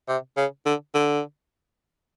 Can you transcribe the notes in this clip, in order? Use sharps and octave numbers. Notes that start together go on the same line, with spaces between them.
C3
C#3
D3
D3